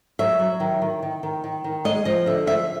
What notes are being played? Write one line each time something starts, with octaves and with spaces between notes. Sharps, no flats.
F#3 E5
F#3
D#3
D#3
D#3
D#3
D#3
D#3
G#3 D#5
F3 D#5
D3 E5
F3 E5